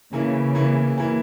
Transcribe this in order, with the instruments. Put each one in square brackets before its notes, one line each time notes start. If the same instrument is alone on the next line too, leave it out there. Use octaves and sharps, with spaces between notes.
[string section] C#3 [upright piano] E3 A#3 E4
[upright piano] E3 A#3 E4
E3 A#3 E4